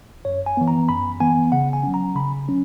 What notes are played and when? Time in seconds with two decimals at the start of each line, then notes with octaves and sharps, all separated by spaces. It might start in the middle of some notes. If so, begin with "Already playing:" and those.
0.25 F#2 C#5
0.46 G#5
0.57 E3 B3
0.68 A#5
0.89 F#2 B5
1.20 E3 B3 G#5
1.52 C#3 F#5
1.73 G#5
1.83 F#3 C#4
1.94 A#5
2.15 C#3 B5
2.48 F#3 C#4